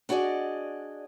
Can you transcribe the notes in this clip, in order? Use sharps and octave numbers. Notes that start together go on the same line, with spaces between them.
D4 F#4 G#4 D5 D#5